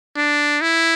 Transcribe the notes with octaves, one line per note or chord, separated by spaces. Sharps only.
D4
E4